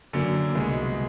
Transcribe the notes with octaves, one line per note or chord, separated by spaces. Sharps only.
F#2 D3 F#3 A#3
C2 B2 G#3